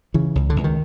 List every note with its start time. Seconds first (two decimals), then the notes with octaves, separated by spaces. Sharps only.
0.14 C#3 E3
0.35 C#2
0.50 D3
0.56 C#2
0.64 D#3